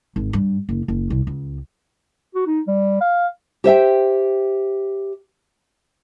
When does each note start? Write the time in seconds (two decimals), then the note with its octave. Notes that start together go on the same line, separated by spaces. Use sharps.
0.16 G#1
0.33 G2
0.69 F#1
0.88 F#1
1.10 C2
1.27 C#2
2.35 F#4
2.46 D#4
2.67 G3
3.01 F5
3.64 G4 C5 E5 G5